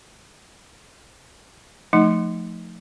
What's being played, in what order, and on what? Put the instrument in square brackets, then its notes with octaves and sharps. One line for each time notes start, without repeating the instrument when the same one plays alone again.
[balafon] F3 A3 D#4